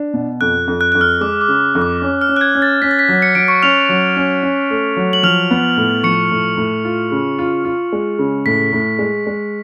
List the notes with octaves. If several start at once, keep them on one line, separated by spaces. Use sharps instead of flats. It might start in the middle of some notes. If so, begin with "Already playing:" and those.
Already playing: D4
B2
F2 F#6
F2
F#6
F2 F#6
F6
G#3 D6
D6
C#3
F2
D6
C#4
F6
C#4
F#6
G#6
C#4
A6
C#4 B6
A6
B6
F#3
C#7
F#3 D7
C#6 C#7
C#4 F6 F7
F#3
C#4
C#4
A3
F#3
F#7
F3 F6 F7
B3
A2
F3 C#6 C#7
A2
A2
F4
C#3
F4
F4
G#3
C#3
A2 B6
A2
G#3
G#3